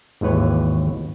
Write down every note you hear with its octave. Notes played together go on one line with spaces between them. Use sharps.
G#1 D#2 E3 B4 C#5